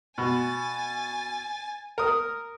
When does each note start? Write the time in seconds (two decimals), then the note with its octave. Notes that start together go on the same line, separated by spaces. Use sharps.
0.18 B2 G#5 A6
1.98 A#4 D#6